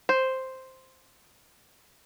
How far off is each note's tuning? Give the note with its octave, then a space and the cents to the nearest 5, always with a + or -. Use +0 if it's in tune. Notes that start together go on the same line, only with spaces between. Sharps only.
C5 +0